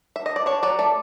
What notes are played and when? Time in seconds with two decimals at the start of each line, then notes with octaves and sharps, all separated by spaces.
0.16 E5
0.26 D#5
0.36 D5
0.46 D4 C#5
0.63 F#3 D5
0.79 A3 D5